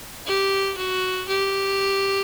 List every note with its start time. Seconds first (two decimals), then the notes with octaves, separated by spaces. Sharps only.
0.26 G4
0.77 F#4
1.28 G4